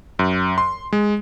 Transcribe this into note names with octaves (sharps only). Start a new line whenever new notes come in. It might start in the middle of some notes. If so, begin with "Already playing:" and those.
F#2
C6
G#3